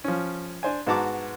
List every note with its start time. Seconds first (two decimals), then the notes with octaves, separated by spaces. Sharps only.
0.04 F3 C#4
0.63 D4 C5 G#5
0.87 G#2 B3 F#4 A5 A#5 D6